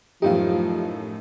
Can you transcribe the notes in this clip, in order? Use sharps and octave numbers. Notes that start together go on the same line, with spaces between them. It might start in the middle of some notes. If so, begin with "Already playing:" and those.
F#2 A2 F3 D#4 G4 F5